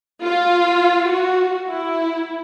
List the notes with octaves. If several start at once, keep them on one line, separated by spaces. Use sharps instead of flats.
F4
F#4
E4